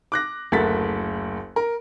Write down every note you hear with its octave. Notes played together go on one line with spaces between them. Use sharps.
D6 F#6 A#6
F#1 D2 A4 A#4 A6 B6
A#4